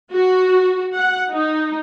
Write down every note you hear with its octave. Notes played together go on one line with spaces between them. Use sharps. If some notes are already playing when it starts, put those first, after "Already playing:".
F#4
F#5
D#4